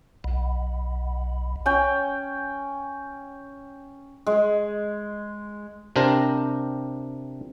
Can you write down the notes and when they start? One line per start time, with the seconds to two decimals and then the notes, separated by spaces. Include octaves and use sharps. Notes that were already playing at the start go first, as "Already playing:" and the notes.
0.24 B1
1.66 C#4 G5
4.27 G#3
5.96 C3 D4 G4 A#4 C5 A#5